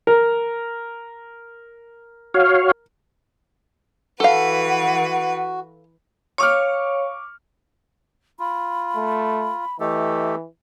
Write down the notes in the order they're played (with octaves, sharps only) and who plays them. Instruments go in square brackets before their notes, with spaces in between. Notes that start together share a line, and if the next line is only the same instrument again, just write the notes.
[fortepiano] A#4
[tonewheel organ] F#4 C#5 F5
[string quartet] E3 B4 [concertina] F#4 [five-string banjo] A4 F5 [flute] F#5
[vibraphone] C#5 F5 [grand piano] C#6 D6 F6
[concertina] F4 [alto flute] B5
[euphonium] A3
[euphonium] E3 [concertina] A3 G4 A4 [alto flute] D#5